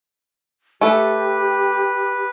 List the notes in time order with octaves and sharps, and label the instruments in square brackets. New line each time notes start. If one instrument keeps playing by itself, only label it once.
[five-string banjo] A3 A4 [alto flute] G4 [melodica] B4